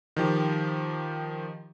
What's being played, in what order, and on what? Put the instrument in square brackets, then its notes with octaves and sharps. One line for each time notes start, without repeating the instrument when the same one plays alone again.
[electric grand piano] D#3 F3 G4